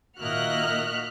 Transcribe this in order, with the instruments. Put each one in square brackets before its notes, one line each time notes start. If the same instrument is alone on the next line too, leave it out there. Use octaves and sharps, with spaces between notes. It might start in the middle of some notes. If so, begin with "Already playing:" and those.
[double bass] A#2 D#3 [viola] A#3 D#5 [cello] F#4 E5 [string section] F6 F#6